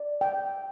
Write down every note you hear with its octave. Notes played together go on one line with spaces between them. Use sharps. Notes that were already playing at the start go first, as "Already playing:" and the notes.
Already playing: D5
G5